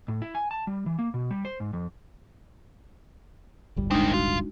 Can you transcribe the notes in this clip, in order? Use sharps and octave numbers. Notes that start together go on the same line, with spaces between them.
A2
E4
G#5
A5
G3
E3
A#3
B2
G3
C5
G#2
F2
D1 G1 G3
D#3 G#3 C4 D4 D#4
F4 F#4